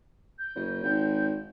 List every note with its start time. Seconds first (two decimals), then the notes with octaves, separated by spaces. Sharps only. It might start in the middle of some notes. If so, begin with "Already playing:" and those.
0.39 G6
0.55 F#1
0.83 G#1